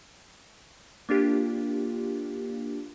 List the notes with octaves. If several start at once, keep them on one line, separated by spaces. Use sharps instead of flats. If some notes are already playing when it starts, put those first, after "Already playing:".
A#3 D4 F4 G4